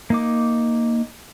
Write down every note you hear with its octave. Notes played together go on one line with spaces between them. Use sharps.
A#3 D#4 D6